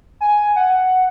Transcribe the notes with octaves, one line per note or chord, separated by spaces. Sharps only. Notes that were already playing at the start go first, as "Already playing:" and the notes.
G#5
F#5